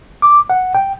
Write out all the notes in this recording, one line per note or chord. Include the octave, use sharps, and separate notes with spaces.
D6
F#5
G5